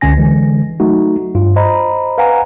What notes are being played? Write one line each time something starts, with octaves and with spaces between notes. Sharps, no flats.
C#2 D3 C#4 G#5 A#6
D3 E3 G#3
F#3 A3 D#4 F#4
G2 F4
C5 D#5 A#5 B5
B4 F5 F#5 G#5 A#5